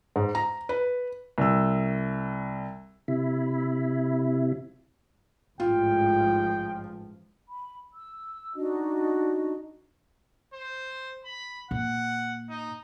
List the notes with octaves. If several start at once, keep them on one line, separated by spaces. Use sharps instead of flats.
G#2
A#5
B4
C2 E6
C3 E4
A1 G#2 F3 F4 G5
B5
E6
D4 D#4 F#4 D#5
C5
B5
A#2 F#5
D#4